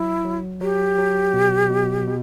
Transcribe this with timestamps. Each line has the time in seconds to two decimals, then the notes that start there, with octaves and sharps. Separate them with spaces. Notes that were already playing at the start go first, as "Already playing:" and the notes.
Already playing: F#3 E4
0.25 F#3
0.61 F#3 G4
0.98 F#3
1.33 B2
1.70 B2
2.07 B2